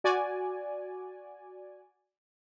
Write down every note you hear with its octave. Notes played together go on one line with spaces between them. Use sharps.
F#4 D5 G#5